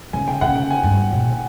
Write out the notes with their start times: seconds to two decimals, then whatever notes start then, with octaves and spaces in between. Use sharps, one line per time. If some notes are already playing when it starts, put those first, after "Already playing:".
0.13 C#3 G#5
0.28 G5
0.41 C#3 F#5
0.56 G5
0.71 G#5
0.83 G2
1.12 A#2